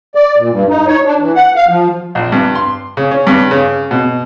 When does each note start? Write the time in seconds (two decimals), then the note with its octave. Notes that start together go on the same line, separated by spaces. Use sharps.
0.15 D5
0.36 A#2
0.50 G2
0.69 D#4
0.87 C#5
1.05 D4
1.19 E3
1.35 F#5
1.55 F5
1.68 F3
2.15 A#1
2.32 G2
2.55 C6
2.97 C#3
3.11 C#4
3.27 G2
3.51 C#3
3.91 B2